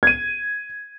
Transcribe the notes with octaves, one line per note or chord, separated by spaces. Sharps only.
G#6 D#7